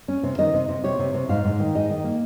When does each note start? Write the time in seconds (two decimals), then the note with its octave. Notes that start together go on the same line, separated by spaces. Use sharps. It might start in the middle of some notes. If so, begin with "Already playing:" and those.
0.08 C#4
0.23 C3
0.38 D#3 D#5
0.54 C3
0.69 C3
0.84 C3 C#5
0.99 C3
1.14 C3
1.29 G#2 F5
1.45 G#2
1.59 D#3
1.75 G#2 D#5
1.90 D#3
2.04 A#3